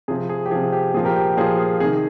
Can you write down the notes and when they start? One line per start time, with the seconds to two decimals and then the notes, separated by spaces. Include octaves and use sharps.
0.08 C3 F3 G#4
0.29 G#4
0.46 G4
0.51 C3 F3 G#4
0.72 G4
0.94 A#2 F3 G#4
1.05 G4 A#4
1.16 G4
1.37 A#2 F3 G#4 C5
1.59 G#4
1.80 C3 D#3 G#4